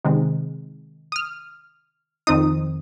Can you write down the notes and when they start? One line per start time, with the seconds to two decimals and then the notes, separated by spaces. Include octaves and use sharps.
0.04 C3 D#3 G#3 C4
1.12 D#6
1.16 F6
2.27 F2 D#3 C4 D#4 D#6